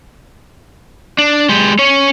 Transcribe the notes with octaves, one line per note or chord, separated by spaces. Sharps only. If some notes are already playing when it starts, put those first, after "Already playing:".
D4
G#3 G4
C#4 C#5